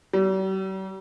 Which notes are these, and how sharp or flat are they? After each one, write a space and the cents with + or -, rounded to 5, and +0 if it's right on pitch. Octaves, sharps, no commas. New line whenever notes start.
G3 -45